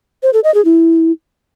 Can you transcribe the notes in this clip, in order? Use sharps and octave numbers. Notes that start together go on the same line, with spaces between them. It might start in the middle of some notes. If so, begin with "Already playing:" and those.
C5
A4
D#5
G#4
E4